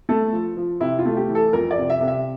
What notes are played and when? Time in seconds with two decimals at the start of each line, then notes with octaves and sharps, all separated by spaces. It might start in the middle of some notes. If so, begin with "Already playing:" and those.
0.09 A3 A4
0.33 F3
0.57 F3
0.80 C3 E4
0.99 F4
1.06 A3
1.17 G4
1.29 E3
1.35 A4
1.53 F2 A#4
1.71 D5
1.78 C3
1.90 E5
2.01 C3
2.08 E5